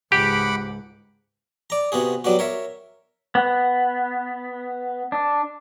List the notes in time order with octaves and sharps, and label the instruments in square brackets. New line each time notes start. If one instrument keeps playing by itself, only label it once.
[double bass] C#2 G#2 [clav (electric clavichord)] G4 [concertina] F#5 B5 D6
[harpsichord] D5 A#5
C3 B3 F#4 G#4
F#3 G3 B3 F#4
A#4 C#5 E5
[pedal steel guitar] B3
D4